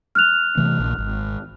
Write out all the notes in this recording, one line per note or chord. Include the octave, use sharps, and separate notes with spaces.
F6 F#6 F7
C3 E3 A3
A#1
G#1